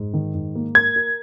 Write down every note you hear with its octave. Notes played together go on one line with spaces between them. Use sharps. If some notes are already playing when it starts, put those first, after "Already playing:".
Already playing: G#2
D#3
G#2
A#3
A#4 G#6
A#4